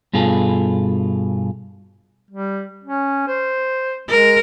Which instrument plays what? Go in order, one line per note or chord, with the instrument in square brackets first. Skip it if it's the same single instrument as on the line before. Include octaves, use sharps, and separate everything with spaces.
[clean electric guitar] G2 B2 F4 G#4 A4
[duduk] G3
C#4
C5
[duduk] G#3 [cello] A#4